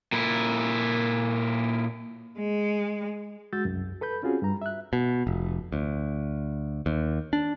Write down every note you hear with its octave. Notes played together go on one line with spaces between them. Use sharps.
A#2 E4
G#3
G#3 F#4 E6 G6 A6
C2 F#2
A4 B4 B5 G6
C4 C#4 F4 F#4 G#4
G2 G3 A#5
E5 F#6
B2
F1
D2
D#2
D4